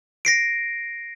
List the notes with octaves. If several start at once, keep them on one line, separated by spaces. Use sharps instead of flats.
A#6 C7 D7